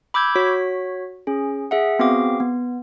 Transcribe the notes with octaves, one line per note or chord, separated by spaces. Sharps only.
B5 D6 E6 G6 G#6
F#4 C#5 B6
C#4 G#4
G#4 E5 F#5
B3 C4 F#4 G#4 F5 D6
B3